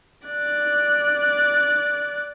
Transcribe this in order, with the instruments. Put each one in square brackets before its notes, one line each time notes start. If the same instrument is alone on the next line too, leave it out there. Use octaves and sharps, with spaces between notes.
[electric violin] D5 F#6